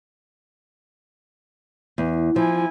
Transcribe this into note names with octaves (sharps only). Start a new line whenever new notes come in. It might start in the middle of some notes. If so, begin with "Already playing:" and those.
E2
F3 E4 G#5